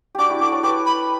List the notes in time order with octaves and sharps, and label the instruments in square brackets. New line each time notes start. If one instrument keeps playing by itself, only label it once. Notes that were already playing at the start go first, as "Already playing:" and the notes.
[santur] D4 F#4 G4 [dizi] D6
[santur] E4 G4
[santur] F#4 A4 [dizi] D6
[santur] A4 C#5
[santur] G4 B4 [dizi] D6
[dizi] B5